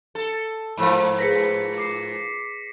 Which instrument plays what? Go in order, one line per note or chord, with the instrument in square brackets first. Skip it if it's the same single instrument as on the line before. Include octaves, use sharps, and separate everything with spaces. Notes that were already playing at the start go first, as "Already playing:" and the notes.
[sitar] A4
[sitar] G#2 F3 A#4 [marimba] B5
[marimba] G#4 B4 [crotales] A#6 B6 C#7
[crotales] D6 C7